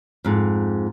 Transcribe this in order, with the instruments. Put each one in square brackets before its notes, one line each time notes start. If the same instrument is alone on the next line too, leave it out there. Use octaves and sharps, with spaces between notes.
[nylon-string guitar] F2 G#2